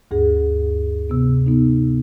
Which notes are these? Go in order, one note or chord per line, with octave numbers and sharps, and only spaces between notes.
D2 G2 G#4
C3 B3
B3 D#4